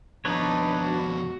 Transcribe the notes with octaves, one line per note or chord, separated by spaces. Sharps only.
F2 B2 D4 D#4 B4 C#5
F#4